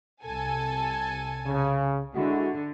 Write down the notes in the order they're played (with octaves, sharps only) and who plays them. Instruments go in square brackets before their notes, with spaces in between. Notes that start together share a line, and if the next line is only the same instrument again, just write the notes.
[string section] C2 A4 G#5
[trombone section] C#3
[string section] D3 [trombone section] G#3 E4 F#4